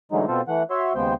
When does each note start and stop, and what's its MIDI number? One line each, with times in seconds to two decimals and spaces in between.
0.12 0.26 45
0.12 0.26 50
0.12 0.26 52
0.12 0.26 54
0.12 0.26 56
0.12 0.26 63
0.28 0.41 47
0.28 0.41 60
0.28 0.41 65
0.28 0.41 69
0.28 0.41 72
0.48 0.63 52
0.48 0.63 57
0.48 0.63 78
0.70 0.93 66
0.70 0.93 73
0.70 0.93 76
0.70 0.93 84
0.95 1.14 39
0.95 1.14 49
0.95 1.14 56
0.95 1.14 59
0.95 1.14 72
0.95 1.14 79